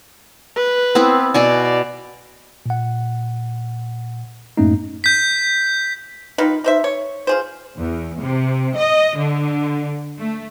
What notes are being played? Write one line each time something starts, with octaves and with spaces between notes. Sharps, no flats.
B4
B3 C4 E4
B2 F#4 D5 G#5
A#2 F#5
F#2 A2 A3 A#3 C#4 D#4
G6 B6
D#3 D#4 F4 B4
D#4 C5 E5
C#5
F4 G#4 C5
E2
C3
D#5
D3
A3